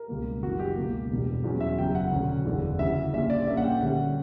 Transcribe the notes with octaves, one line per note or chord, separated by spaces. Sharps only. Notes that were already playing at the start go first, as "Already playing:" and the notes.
Already playing: A#4
C#2 B2 G3 A#3
F#1 F#2 E3 F#4
G4
C#2 B2 A#3
E1 E2 B2 G3
E2 B2 F#3 C#4
E5
F#1 F#2 C#3 G5
F#5
E1 D2 D3 F#3 C#4
F#1 E2 D3 G3
D2 C#3 E3 E5
A#1 A#2 G3 C#4 E5
D5
A#1 A#2 A#3 C#4 E5
F#5
G5
D2 D3 G3 C#4 F#5